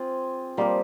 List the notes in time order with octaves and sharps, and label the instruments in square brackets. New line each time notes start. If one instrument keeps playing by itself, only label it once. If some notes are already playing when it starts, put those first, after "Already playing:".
Already playing: [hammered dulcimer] C4 F4 G#4
[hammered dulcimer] F3 C4 G4 A#4 [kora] G3 A#3